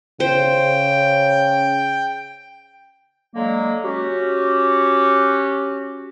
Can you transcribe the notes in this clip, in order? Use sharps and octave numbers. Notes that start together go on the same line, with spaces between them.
C#3 C5 G5
D3 F#3 G#3 A#3
C#4 F#4 G4